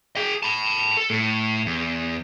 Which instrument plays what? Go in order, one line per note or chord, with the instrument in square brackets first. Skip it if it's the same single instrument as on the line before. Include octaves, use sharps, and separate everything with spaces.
[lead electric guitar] G#4 G5
A5 B5
A4
A2
E2